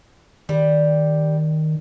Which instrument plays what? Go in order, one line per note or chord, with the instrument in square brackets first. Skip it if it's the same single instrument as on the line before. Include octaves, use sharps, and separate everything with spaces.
[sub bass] D#3 [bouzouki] G3